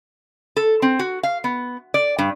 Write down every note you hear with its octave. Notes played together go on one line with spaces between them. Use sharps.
A4
C4
F#4
F5
B3
D5
G2